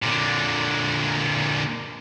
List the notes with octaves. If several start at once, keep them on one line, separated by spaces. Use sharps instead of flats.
A#2 D3